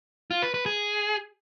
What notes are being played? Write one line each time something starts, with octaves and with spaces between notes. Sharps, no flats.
F4
B4
B4
G#4